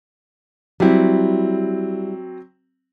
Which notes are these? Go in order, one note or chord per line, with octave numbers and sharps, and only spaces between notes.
F#3 G3 C4 E4